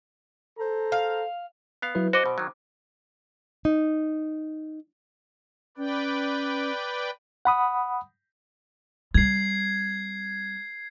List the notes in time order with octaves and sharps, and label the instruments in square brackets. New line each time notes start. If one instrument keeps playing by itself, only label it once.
[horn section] A4 C5 A#5
[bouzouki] F5
[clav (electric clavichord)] B3 F5
[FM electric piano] F#3 E4 B4
[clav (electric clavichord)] F#4 D#5 A5 [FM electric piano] C5 D6
[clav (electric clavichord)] B2
D#3 F#3
[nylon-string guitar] D#4
[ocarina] C#4 [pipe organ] B4 D5 G5
[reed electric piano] F#5 B5 D#6
[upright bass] G3 C4 [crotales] G#6 C7